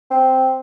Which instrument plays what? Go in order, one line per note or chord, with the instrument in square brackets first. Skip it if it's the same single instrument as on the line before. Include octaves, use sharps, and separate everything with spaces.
[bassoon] C4